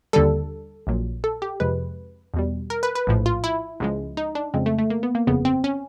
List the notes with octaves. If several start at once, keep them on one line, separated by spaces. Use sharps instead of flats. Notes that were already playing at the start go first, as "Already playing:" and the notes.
D#2 D3 G3 A4
A#1 A#2 F#3
A4
G4
F2 C3 F3 G#3 B4
E2 B2 G3
A#4
B4
B4
A#1 A2 F3
F4
E4
C#2 C#3 F3 G#3
D#4
D4
F2 C#3 F3 G#3 C4
A3
A3
A#3
B3
A#3
G1 F2 C#3 B3
C4
C#4